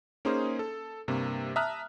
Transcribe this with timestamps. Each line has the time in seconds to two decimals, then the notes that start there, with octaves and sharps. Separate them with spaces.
0.25 A#3 C#4 D#4 G#4 C5
0.59 A4
1.08 G2 C3 A#3
1.56 E5 A5 A#5 D#6 F6 F#6